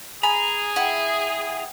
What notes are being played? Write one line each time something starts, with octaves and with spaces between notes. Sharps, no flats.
G#4 G#5 A#5 B5
E4 F#5 G5